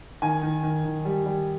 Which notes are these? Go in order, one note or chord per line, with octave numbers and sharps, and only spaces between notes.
D#3 G#5
D#3
D#3
D#3
G3
G3